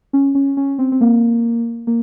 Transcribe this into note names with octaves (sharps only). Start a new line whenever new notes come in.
C#4
C#4
C#4
C4
C4
A#3
A#3